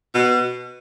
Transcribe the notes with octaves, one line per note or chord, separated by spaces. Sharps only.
B2